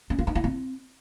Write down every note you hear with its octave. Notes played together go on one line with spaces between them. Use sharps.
C#4
F4
D#4
E4
C4